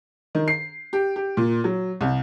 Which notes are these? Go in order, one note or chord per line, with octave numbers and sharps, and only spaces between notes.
D#3
C7
G4
G4
A#2
F#3
C2